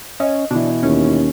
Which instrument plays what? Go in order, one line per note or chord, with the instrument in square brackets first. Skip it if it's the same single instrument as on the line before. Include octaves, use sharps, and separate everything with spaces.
[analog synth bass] C#4 [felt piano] D#5
[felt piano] B2 E3 [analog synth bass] D4
[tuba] D#2 [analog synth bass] C#4